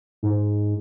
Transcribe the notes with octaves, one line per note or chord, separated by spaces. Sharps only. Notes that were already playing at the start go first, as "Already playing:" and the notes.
G#2